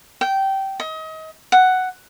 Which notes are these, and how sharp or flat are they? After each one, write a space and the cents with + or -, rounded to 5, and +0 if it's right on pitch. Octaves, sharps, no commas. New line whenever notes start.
G5 -15
D#5 +30
F#5 +5